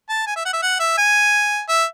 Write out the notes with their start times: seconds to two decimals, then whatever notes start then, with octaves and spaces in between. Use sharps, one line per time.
0.09 A5
0.27 G#5
0.36 E5
0.45 F#5
0.53 E5
0.62 F#5
0.80 E5
0.98 G#5
1.69 E5